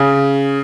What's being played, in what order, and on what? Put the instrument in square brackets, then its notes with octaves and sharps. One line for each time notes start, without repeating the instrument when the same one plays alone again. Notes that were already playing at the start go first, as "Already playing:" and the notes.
Already playing: [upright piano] C#3